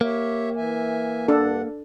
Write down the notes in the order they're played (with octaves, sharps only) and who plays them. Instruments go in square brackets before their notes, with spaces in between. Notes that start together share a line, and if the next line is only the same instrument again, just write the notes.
[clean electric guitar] A#3 [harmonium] G4 C#5 E5
[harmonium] E3 E5 G#5
[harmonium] G2 F#5 [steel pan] D4 A4